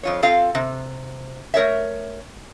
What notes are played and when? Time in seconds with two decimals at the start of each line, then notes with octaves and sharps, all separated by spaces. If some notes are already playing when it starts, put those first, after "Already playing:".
0.03 F2 F4 C#5
0.22 C4 F4 A4 F5
0.55 C3
1.54 A3 A#4 C#5 E5